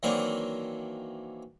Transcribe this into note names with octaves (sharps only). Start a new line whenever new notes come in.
D#3 E3 F#3 A#3 C4 D4